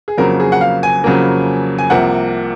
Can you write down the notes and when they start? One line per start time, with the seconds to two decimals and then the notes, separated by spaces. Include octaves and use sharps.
0.08 G#4
0.18 F2 C#3 F#3 A#3 A#4
0.40 G#4
0.52 F#5
0.61 F5
0.83 G#5
1.04 F2 C#3 F#3 A#3
1.78 G#5
1.90 C2 C3 F3 A#3 F#5